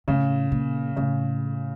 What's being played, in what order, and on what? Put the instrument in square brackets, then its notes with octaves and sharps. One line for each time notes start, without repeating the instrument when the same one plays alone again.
[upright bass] A2 [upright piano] C#3
[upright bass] A#2
[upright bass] A2 [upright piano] C#3